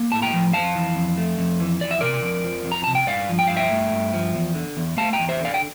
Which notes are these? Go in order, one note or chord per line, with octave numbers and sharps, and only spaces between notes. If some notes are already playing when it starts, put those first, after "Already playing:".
Already playing: A#3
A2 A5
G5 A#5
F3
F2 F5 A5
E3
F2
A3
F2
E3
F2 D5
E5
C3 A#4 D5
F2
F3
F2
A#5
C3 A5
G5
G2 D5 F5
F3
G5
G2 F5
E5 G5
A3
G2
F3
E2
D3
E2
A3 F5 A5
G5 A#5
E2
C5 E5
D3
D5 F5
G5